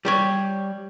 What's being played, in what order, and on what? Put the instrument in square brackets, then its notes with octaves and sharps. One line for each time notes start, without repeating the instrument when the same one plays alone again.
[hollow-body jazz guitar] G3 G4 C#5